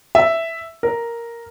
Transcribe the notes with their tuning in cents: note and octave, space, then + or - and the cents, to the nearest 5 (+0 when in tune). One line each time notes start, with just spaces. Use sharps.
E5 +0
A#4 +0